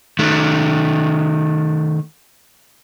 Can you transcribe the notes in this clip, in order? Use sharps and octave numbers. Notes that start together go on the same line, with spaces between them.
D#3 A3